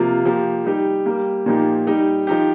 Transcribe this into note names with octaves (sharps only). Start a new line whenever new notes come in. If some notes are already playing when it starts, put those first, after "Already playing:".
Already playing: C3 F3 A#3 F4
F3 A#3 G4
G3 D#4 G4
G3 A#3 G4
A#2 F3 A#3 D#4 G4
G3 D#4 G4
F3 D#4 G4